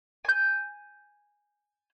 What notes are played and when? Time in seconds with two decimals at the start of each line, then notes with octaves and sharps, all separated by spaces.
0.25 G#5 G6